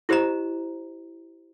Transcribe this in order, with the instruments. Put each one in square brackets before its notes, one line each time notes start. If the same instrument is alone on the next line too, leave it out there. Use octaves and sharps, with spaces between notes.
[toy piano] E4 G4 C5 D#5 A#5